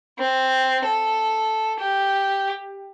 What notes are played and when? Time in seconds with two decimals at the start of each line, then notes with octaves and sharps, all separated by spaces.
0.19 C4
0.85 A4
1.79 G4